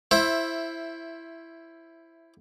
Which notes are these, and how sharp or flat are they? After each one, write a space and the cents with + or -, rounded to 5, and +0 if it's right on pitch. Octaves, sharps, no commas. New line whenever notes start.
E4 +10 C5 +25 E5 +0